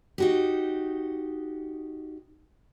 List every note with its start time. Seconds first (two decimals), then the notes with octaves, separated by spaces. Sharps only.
0.18 D#4 F#4 G4